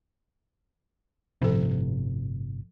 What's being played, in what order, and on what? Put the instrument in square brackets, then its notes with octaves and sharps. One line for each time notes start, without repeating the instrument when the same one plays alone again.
[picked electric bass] G1 A2 C3 [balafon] F3 A4